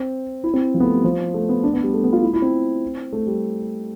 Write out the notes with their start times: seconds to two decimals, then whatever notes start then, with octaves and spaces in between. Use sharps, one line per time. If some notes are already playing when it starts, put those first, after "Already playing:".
Already playing: C4
0.44 E4
0.54 C4
0.74 F3
0.80 B3
0.83 A3
0.94 G3
1.04 F3
1.34 A3
1.49 B3
1.63 D4
1.73 B3
1.83 G3
1.94 A3
2.04 B3
2.13 F4
2.22 E4
2.33 E4
2.42 C4
3.13 A3
3.27 G3